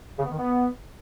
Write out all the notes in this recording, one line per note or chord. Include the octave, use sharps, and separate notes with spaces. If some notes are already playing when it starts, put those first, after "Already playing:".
C#3
B3
D#3
B3